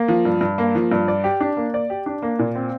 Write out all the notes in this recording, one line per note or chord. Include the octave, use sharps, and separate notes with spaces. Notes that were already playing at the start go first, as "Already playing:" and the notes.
Already playing: A#3
F3
G2
G2
A#3
F3
G2
D5
G4
D4
A#3
D5
G4
D4
A#3
A#2
C4